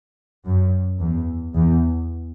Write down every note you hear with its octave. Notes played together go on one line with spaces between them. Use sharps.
F#2
E2
E2